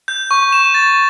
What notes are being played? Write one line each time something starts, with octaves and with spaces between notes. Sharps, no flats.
G6
C#6
E7
A6